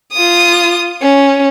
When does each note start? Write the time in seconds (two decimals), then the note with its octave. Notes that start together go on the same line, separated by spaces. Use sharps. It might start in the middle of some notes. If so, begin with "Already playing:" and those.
0.13 F4 D#6
1.02 C#4